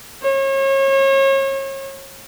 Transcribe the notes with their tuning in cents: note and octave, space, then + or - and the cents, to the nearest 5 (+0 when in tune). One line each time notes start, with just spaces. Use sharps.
C#5 -35